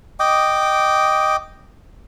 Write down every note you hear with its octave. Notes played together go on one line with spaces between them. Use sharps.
D#5 G5 D6